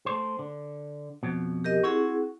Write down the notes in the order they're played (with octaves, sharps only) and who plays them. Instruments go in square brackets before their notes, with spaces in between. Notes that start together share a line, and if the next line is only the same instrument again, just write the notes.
[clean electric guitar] A3 C5
D3
F2 B2
[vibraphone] G4 A#4 D#5
[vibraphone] C4 E4 G#4 [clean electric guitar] F#4